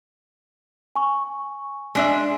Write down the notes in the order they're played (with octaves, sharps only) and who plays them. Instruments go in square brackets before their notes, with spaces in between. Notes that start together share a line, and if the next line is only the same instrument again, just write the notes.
[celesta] G#5 C#6
[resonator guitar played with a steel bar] G#3 D4 E5